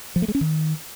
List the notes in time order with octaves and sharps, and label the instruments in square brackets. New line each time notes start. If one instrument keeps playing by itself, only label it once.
[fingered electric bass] F3
A3
G#3
C#4
D#3